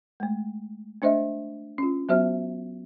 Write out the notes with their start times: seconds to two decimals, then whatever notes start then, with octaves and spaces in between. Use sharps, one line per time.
0.20 G#3 A3
1.02 A3 D4 C5 D#5 E5
1.78 C#4 F4
2.09 F#3 B3 F#4 C5 E5 F6